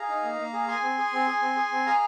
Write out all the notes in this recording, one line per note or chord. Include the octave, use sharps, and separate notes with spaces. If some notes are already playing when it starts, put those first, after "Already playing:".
Already playing: G#4 F5 A#5
D#4
A#3
A#3
G#4
G#4 G#5 C6
C4
G#4
C4
G#4
C4
G#4
C4
G#4 F5 A#5